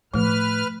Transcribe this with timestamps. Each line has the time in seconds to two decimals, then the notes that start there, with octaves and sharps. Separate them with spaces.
0.14 A2 F3 A3 B4 F6